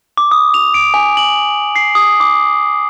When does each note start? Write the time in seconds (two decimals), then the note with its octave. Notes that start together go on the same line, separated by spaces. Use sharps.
0.17 D6
0.31 D#6
0.54 F7
0.74 D7
0.94 G#5
1.17 F#7
1.76 C7
1.95 D#6
2.20 D6